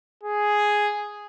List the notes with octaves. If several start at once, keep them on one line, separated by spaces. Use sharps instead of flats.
G#4